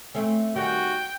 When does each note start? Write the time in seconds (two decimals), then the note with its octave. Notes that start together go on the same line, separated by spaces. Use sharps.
0.15 A3 C4 C#4
0.56 D#3 G3 C#4 F#4 G5